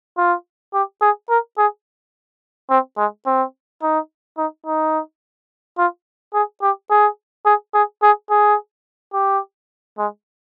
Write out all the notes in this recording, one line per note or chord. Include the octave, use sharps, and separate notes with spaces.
F4
G4
G#4
A#4
G#4
C4
G#3
C4
D#4
D#4
D#4
F4
G#4
G4
G#4
G#4
G#4
G#4
G#4
G4
G#3